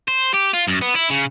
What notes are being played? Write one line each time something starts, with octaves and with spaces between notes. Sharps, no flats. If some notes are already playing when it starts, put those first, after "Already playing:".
C5
G4
F4
F#2
B3
E4
C#3